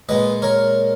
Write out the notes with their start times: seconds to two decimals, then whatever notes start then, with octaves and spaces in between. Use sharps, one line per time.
0.09 A#2 G#3 B4 D#5
0.42 A#4 C#5